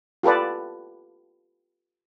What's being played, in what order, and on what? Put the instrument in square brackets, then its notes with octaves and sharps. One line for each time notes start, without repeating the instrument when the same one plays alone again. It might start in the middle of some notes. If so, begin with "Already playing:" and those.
[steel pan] F4 G4 A4 B4 D5